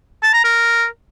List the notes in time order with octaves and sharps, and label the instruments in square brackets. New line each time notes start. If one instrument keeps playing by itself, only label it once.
[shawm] A5
A#5
A#4